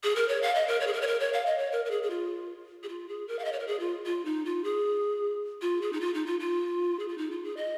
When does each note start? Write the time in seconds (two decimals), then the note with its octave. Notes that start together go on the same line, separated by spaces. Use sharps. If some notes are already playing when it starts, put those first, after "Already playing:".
0.03 G#4
0.16 A#4
0.29 C#5
0.42 F5
0.55 D#5
0.68 A#4
0.80 C#5
0.87 G#4
0.93 A#4
1.01 C#5
1.07 A#4
1.20 C#5
1.33 F5
1.46 D#5
1.58 C#5
1.72 A#4
1.85 A#4
1.91 G#4
2.03 G#4
2.10 F4
2.83 G#4
2.89 F4
3.09 G#4
3.28 A#4
3.39 F5
3.45 D#5
3.53 C#5
3.60 A#4
3.67 G#4
3.80 F4
4.06 F4
4.25 D#4
4.46 F4
4.64 G#4
5.62 F4
5.82 G#4
5.93 D#4
6.01 F4
6.14 D#4
6.26 F4
6.40 F4
6.99 G#4
7.09 F4
7.18 D#4
7.31 F4
7.44 G#4
7.57 D#5